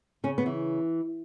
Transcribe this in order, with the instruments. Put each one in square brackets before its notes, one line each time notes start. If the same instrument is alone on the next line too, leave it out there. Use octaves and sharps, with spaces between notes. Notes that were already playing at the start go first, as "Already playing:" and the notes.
[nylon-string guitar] C#3 C#4
B3
E3